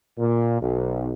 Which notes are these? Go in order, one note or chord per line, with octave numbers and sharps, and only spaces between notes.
A#2
B1